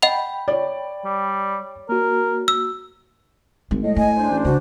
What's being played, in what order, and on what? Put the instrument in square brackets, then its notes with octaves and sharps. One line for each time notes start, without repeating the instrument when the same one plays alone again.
[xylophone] D#5 F#5 F7 [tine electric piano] G5 B5
[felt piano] C#5 D5
[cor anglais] G3
[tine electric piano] A#3 F#4 [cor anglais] A#4
[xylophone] E6
[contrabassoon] G#1 [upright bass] G#3
[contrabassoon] A2 [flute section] D#5
[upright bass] A3 [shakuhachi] G#5
[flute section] D4 C5
[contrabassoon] A1
[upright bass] C#2 [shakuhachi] F#4